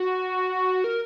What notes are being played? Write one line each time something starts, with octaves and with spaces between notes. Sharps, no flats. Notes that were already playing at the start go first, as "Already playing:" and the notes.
Already playing: F#4
A#4